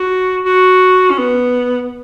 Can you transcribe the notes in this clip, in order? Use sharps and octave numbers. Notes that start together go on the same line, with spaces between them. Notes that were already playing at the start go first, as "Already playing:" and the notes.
Already playing: F#4
F#4
C#4
B3